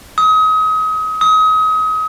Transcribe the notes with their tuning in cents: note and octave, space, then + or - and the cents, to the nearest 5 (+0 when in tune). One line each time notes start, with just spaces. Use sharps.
D#6 +35
D#6 +35